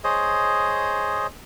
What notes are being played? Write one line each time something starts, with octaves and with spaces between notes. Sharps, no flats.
G#4 C5 C#5 D#5